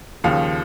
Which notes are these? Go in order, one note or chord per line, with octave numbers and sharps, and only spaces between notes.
D#2 C#3 F3 F5